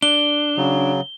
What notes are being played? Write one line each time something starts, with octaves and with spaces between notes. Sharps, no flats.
D4 G7
C#3 F#3